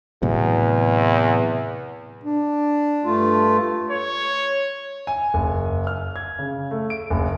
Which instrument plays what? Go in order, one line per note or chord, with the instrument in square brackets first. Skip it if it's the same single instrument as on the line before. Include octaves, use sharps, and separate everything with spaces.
[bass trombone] E2 [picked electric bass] A2 C3 F#3
[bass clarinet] D4
[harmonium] G2 A3 F4
[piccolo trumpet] C#5
[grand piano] G#5
F#1
F6
G#6
C#3
A3
D7
F#1